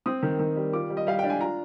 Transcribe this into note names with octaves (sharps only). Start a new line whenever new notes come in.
C4 D#6
D#3
D#3
G3
F4 D6
G3
D#5
G3 F5
D4 G5
G#5
F4 A#5